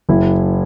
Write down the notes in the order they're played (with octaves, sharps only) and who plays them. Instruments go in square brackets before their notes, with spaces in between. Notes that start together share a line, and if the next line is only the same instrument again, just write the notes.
[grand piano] F#1 E4